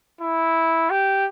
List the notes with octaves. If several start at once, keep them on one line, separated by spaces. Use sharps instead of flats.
E4
G4